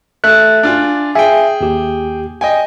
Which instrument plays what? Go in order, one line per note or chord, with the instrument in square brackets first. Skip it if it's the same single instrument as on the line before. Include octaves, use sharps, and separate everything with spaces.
[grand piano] A3 E5 [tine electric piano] F#6
[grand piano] D4 F4 G#5
[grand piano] G#4 G5 [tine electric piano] E5 G#5
[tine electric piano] D#2 G4
[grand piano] D#5 G5 G#5